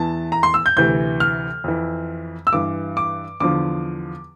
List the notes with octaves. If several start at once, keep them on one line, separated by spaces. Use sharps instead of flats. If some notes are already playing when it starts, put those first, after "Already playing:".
Already playing: E2 E3 A5
A#5
C6
E6
G6
D2 C3 E3 G6
F6
F2 E3
E6
G2 E3 D6
D6
E2 D3 F3 D6